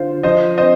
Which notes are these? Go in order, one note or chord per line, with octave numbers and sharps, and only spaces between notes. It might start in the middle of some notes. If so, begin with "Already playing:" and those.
Already playing: D3 F4 C5
F3 C5 D#5
C4 C5 D#5